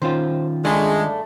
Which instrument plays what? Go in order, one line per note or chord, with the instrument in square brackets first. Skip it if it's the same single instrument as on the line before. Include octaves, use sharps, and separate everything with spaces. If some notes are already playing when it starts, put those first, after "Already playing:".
[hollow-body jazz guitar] D#3 C#4 F4 [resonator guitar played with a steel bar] C5
[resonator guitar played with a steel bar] G2 A3 D5 [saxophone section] G#3